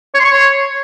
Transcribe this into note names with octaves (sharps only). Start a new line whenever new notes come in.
C#5
C6
C#6
C#5